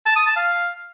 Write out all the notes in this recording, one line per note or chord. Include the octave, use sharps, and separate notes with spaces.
A5
D#6
A5
F5